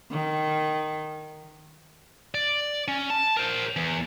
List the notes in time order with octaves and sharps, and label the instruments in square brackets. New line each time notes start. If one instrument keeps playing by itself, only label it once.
[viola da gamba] D#3
[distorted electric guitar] D5
C#4
A5
A#4 C5
E2